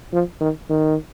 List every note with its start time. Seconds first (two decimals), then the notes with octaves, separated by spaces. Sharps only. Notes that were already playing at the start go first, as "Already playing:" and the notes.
0.13 F3
0.41 D#3
0.69 D#3